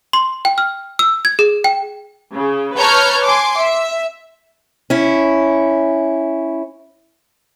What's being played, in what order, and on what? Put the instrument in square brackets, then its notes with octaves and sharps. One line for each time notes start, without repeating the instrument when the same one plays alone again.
[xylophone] C6
G5
F6
E6
G#6
G#4
G5
[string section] C#3
B4 C#5 A5 A#5 F6 G6
G#5 C6 D6
E5
[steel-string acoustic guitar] C#4 E4